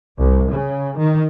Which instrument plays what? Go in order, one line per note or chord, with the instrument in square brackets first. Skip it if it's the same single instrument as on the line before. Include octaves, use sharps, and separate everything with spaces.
[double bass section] C2
C#3
D#3